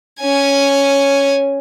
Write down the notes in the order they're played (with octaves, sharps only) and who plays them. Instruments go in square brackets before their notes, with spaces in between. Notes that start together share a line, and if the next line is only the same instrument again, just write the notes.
[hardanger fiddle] C#4 G#5